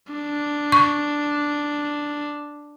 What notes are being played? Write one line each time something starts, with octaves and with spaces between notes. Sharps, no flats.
D4
C#6